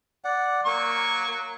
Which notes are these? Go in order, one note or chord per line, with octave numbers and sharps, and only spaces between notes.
D5 F#5
F#3 A#3 C#6